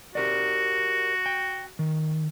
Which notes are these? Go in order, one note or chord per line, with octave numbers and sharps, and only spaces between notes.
F#4 G4 A#4 D5
G5
D#3